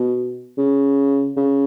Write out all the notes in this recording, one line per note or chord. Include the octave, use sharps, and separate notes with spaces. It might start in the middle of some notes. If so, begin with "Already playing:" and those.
Already playing: B2
C#3
C#3